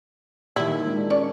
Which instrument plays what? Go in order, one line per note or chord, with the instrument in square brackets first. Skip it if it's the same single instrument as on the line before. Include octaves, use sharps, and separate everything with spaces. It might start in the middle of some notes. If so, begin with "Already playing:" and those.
[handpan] A#2 D#3 [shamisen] E3 G3 E4
[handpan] G#3 D4
[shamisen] C#4 C#5 D5